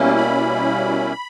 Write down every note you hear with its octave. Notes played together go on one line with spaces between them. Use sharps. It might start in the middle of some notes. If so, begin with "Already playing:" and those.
Already playing: B2 G3 A#3 C#4 E4
B5